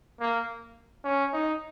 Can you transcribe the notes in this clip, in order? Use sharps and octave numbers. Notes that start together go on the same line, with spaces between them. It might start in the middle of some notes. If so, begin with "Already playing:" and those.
A#3
C#4
D#4